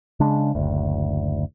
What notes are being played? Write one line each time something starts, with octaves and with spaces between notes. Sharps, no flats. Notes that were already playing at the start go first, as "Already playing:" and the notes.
C#3 G#3 D4
F#1 D2